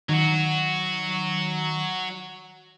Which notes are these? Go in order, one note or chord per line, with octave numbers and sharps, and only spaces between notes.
D#3 F#3 F#4